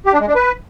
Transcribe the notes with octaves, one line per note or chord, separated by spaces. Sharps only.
G4
D4
G#3
D4
B4